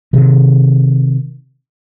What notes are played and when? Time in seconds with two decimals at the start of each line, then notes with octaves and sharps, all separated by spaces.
0.13 C3 D#3